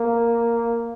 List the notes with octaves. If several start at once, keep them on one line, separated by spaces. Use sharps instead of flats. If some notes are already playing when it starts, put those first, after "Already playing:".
Already playing: A#3